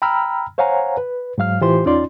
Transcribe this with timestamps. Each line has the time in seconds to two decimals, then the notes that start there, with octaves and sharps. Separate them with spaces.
0.02 G5 A#5 B5 E6 F6
0.58 C5 C#5 F5 F#5 G#5 A#5
0.97 B4
1.38 G#2 F#3 F5 F6
1.61 A2 E3 F4 G4 C5 C6
1.85 E2 C#4 D#4 F4 D5 C6